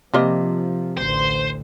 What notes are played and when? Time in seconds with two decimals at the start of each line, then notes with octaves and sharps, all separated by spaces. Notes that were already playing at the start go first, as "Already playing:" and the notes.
0.14 C3 F3 G3 A#3 D#5
0.98 A1 D2 C5